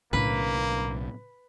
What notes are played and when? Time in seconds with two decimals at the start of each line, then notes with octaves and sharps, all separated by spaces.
0.13 B1 A2 C#3 G#3 A#3 D4 B4